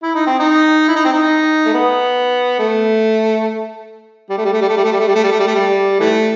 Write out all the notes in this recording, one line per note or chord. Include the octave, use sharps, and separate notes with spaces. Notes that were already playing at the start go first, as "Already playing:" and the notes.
E4
D#4
C4
D#4
E4
D#4
C4
D#4
A3
B3
A3
G3
A3
G3
A3
G3
A3
G3
A3
G3
A3
G3
A3
G3
A3
G3
A3
G3
E3 A3